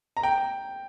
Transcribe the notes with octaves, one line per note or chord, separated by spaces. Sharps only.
A#5
G5